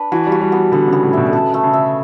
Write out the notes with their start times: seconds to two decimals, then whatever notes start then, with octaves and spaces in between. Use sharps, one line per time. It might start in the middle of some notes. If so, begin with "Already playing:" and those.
Already playing: D4 B4
0.12 E3 F#4
0.27 G3
0.32 F#4
0.41 G3
0.52 B3
0.58 E3
0.72 D3 B3
0.88 C#3 B3
1.03 A2
1.13 B2 E5
1.27 D3
1.33 C#3 A4
1.54 A3
1.63 C#3
1.73 E5